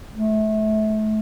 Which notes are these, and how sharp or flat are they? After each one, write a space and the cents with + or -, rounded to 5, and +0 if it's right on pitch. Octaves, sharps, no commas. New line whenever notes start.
A3 -30